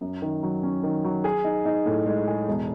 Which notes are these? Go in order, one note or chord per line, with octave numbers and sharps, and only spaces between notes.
F#2
D#3
F#3
C#4
D#3
F#3
G#4
D#4
D#4
A2
G#3
G#4
E1